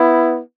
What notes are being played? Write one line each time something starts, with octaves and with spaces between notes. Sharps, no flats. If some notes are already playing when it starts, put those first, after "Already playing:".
Already playing: B3 E4